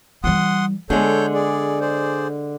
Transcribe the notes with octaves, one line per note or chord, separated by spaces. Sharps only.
E3 G3 F#5 C6 D#6
D3 G#3 B3 A4 C#5 G6
G#4 D5
G#4 C5 D5